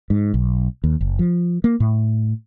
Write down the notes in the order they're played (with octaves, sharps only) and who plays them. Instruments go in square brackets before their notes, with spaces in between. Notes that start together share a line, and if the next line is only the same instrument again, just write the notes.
[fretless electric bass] G#2
B1
D#2
F#1
F3
A#3
A2